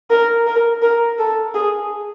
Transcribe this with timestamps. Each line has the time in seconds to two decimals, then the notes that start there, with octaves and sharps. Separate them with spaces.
0.10 A#4
0.47 A#4
0.82 A#4
1.19 A4
1.55 G#4